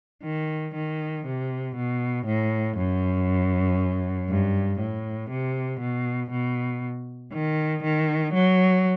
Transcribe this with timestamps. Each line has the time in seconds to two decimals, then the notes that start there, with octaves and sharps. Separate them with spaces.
0.24 D#3
0.75 D#3
1.26 C3
1.76 B2
2.26 A2
2.77 F#2
4.29 G2
4.79 A2
5.30 C3
5.80 B2
6.31 B2
7.32 D#3
7.83 D#3
8.33 F#3